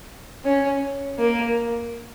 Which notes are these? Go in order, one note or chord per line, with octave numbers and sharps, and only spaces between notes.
C#4
A#3